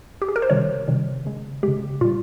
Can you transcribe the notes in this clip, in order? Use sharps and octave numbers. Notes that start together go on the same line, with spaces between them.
G4
G#4
A#4
C5
C3 D#3 G3 C#5
C3 D#3 G3
C#3 G#3
C#3 G#3 G4
A#2 G3 F4